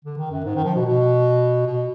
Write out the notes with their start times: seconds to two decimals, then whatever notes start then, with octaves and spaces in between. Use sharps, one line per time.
0.05 D3
0.17 D#3
0.30 F#2
0.45 G#2
0.55 D#3
0.64 F3
0.75 B2
0.85 B2
1.67 B2